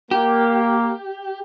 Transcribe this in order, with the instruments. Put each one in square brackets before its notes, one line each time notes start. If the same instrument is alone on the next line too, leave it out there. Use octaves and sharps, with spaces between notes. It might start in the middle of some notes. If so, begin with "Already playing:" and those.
[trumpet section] A#3 [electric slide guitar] G4